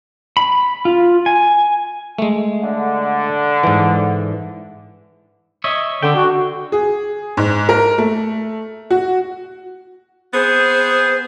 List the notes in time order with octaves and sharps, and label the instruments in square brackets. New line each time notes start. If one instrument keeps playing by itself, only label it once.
[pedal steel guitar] B5
F4
G#5
[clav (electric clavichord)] G#3 A3
[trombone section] D3
[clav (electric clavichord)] G#2 E3
[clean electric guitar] C#5 D#5 E5
[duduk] D3 [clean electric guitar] D4 G5
[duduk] F#4
[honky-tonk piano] G#4
G#2
A#4
A3
F#4
[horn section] B3 C4 G#4 [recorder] C5